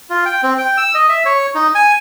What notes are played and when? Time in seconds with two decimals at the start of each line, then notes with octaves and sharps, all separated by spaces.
0.10 F4
0.26 G5
0.43 C4
0.58 G5
0.77 E6
0.95 D#5
1.09 E5
1.25 C#5
1.55 D#4
1.75 G#5